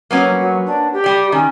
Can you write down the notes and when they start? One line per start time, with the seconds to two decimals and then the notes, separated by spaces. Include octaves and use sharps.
0.11 F#3 A#3 B3 C#4
0.39 F#3
0.66 D4
0.93 G4
1.04 G3 D5
1.32 D#3 C#4